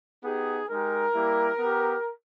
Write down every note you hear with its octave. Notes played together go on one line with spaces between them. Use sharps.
B3 D#4 G4 G#4
G#3 D#4 G4 A#4
G3 A#3 E4 G4
B3 G4